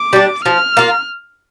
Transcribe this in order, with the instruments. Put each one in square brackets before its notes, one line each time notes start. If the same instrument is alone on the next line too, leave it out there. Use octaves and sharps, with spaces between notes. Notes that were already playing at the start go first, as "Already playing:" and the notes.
Already playing: [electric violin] D6
[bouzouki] G3 D4
[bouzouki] F3 [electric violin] F6
[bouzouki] A#3 F4